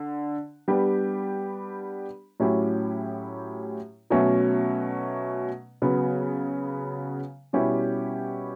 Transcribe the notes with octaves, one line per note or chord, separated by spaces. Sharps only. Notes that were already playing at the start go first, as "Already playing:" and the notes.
Already playing: D3
G3 B3 D4 G4
A2 F#3 C#4 E4 G4
B2 F#3 A3 C#4
C#3 F#3 B3
B2 G3 C#4 E4 G4